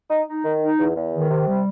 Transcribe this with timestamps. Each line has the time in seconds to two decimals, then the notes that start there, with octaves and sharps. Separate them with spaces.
0.10 D#4
0.27 D#4
0.44 D#3
0.62 D#4
0.79 E2
0.96 E2
1.13 D#3
1.30 C3
1.47 G3